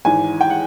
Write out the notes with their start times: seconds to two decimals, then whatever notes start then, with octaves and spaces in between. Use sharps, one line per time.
0.05 G#1 G#2 E3 G#5
0.41 G5
0.50 F#5